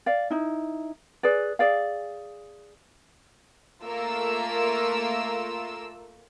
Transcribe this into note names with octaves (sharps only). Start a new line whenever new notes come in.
D5 F5
D#4 E4
G#4 B4 D5
G#4 D5 F5
A3 A#3 F4 A#4 E6